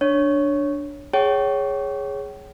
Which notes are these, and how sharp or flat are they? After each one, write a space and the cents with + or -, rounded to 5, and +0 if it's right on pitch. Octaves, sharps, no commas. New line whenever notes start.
D4 +0 C#5 +0
G#4 +0 C#5 +0 G5 -40